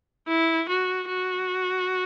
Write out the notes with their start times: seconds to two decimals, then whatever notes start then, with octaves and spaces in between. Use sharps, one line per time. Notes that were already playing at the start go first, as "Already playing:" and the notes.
0.27 E4
0.68 F#4
1.09 F#4